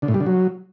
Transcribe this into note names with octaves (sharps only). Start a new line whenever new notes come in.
D3
A2
G3
D3
F#3